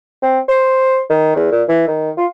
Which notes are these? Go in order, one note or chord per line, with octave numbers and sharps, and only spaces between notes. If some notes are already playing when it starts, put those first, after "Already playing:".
C4
C5
D#3
E2
A#2
E3
D#3
F4